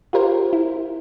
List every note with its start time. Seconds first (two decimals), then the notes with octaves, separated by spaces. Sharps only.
0.13 F4 G4 A#4 C5
0.53 E4